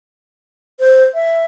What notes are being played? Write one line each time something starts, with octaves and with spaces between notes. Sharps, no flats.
C5
E5